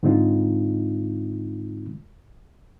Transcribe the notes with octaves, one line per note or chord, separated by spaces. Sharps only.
G#2 D3 G#3 C4 D#4 F4